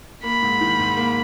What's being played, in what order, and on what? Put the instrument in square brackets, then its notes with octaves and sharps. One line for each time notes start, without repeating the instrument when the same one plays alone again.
[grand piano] A#3 [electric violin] B5
[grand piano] G#2
D#3
G#2
A#3